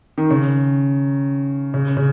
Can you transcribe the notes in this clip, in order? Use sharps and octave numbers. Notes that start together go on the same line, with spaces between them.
D#3
C#3
C#3
C#3